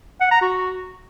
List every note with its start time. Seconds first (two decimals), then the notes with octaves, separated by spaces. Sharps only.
0.21 F#5
0.31 A#5
0.42 F#4